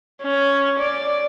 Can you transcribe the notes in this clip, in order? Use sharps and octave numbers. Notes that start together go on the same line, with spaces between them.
C#4
D5